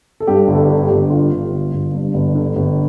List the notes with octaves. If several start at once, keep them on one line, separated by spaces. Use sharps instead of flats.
A4
G2 G4
G1
A4
D3
G4
G1
G2 F4
G1
D3
G1
G2
G1
D3
G1